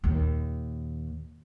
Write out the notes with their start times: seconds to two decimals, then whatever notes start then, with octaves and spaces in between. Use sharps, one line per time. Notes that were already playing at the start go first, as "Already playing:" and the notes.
0.04 D#2 A#2